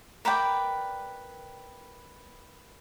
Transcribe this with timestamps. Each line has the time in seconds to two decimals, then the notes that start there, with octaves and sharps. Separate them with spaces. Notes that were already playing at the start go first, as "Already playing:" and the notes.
0.25 A#4 B4 D5 G5